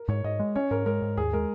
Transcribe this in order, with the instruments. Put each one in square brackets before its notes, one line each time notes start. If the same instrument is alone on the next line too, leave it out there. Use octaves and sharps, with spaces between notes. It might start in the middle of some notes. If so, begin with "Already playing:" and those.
Already playing: [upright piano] A#4
[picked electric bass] G#2 [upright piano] C#5
[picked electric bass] G#2 [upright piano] D#5
[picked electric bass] G#3
[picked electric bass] C#4 [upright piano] C#5
[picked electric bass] G#2 [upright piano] A#4
[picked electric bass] G#3 [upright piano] A#4
[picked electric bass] G#2
[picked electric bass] D#2 [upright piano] G#4
[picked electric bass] G#3 [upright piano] A#4